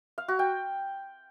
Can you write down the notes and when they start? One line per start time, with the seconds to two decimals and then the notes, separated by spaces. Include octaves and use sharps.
0.18 F5
0.28 F#4
0.39 G5